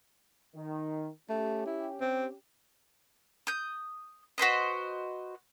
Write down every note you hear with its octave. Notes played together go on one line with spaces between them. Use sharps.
D#3
A3 C#4 G4
E4
C4
D#6 G6
F#4 B4 C5 D#5